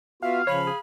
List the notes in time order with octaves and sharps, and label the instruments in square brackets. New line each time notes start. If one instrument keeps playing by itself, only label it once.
[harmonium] B3 F4 F#4 [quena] E5 [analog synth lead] F5
[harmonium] C#3 F3 [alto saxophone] C#5 [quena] B5
[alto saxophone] G#4